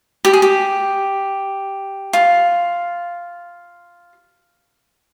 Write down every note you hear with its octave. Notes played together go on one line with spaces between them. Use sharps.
G4
G#4
G4
F4